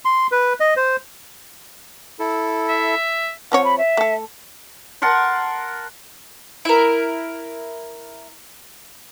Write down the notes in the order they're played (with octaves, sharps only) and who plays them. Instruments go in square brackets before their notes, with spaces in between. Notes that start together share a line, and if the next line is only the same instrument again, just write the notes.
[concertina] C6
B4
D#5
C5
[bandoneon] E4 A4
[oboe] E5
[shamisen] F3 C4 C#5 [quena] F#5
[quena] B5
E5
[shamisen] A3 A4
[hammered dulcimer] A#4 F#5 A5 C6
[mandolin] E4 A#4